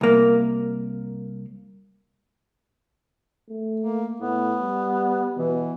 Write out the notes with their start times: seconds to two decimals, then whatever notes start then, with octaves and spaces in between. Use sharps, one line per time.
0.01 C2 A#3
3.49 A3
3.80 A#3
4.20 A2 B3
4.62 G3
5.37 B2 E3